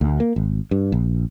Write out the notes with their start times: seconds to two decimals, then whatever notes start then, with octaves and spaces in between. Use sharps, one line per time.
0.01 D2
0.20 A#3
0.36 G#1
0.71 G2
0.92 A#1